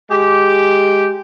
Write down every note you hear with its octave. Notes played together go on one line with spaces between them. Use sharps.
G#3 G4